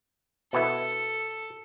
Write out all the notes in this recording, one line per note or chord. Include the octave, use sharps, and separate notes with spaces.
B2 B3 E4 A4